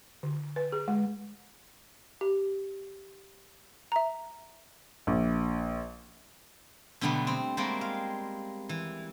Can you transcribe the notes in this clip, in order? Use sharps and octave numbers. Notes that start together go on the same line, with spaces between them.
D3
B4
G#4
G#3
G4
E5 A#5
A#1
B2 D3 F#3 G3 A3 B3
C4
G3 G#3 A#3 C4 F#4
F5
E3